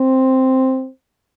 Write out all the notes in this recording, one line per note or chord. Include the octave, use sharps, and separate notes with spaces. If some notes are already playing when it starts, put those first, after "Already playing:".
Already playing: C4